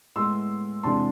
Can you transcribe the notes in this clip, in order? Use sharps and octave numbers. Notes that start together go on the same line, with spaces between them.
A2 G#3 B3 C6 E6
E2 C3 E3 G#3 D4 A5 C6